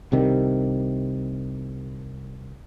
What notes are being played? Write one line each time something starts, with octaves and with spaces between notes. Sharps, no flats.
C2 C3 D#3 G3